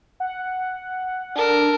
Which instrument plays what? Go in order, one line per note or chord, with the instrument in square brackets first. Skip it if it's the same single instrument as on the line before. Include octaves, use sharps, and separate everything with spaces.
[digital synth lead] F#5
[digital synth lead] D4 [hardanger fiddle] A4 A#4